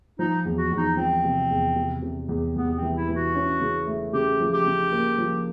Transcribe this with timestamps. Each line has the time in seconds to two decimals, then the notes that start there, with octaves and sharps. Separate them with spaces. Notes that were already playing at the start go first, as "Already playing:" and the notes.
0.19 F3 D#4
0.45 E2
0.57 F#4
0.71 E2
0.77 D#4
0.97 F3 C4
1.24 C3
1.50 E2
1.76 C3
2.02 C3
2.29 E2
2.56 E2 B3
2.76 C4
2.82 E3
2.95 E4
3.08 E3
3.15 F#4
3.35 C#4
3.60 C#3
3.87 A3
4.13 C#3 G4
4.40 F3
4.53 G4
4.66 C#3
4.93 A#3
5.18 F3